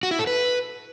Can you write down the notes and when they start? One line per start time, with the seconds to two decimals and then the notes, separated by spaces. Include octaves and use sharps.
0.03 F#4
0.11 E4
0.19 A4
0.27 B4